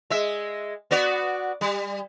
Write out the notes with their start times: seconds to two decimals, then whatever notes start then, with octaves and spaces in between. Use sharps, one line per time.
0.10 G#3 E5
0.91 B3 F#4 D5
1.61 G3